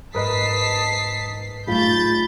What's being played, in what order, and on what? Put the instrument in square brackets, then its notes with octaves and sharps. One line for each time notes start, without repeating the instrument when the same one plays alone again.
[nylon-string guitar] G#2 [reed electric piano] A#4 B4 D#5 [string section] A5 B6 C7 [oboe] D#6
[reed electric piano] A2 F4 [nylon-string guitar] A3 D#4 G#4 [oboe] B5 [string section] G6 A6